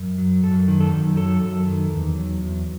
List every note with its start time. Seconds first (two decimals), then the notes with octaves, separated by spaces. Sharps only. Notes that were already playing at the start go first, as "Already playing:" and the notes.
Already playing: F#2
0.18 F#3
0.44 F#2 A4
0.68 D#3
0.80 A4
0.93 F#2
1.16 F#3 A4
1.41 F#2
1.66 D#3
1.90 E2
2.15 F#3
2.41 E2